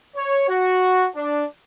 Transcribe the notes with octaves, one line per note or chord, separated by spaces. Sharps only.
C#5
F#4
D4